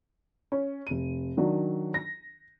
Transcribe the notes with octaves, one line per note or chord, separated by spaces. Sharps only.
C#4
F1 D#7
D#3 F#3 D4
A#6